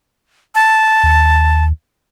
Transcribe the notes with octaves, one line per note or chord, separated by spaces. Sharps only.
A5
D#2